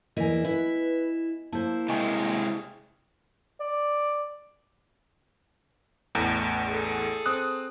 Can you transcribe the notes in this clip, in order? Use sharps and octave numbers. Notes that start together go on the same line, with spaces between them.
E2 A#3 E4 D#5 G#5
E4 B4
A#3 E4 C5 A5
C3 G#3 D#5 G#5 C#6
D5
A1 E2 A3
G#4 A4
C4 D#6 F#6